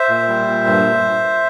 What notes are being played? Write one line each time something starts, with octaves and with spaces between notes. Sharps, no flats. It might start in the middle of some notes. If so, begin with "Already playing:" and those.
Already playing: C5 E5
A#2
G3
A#2
G2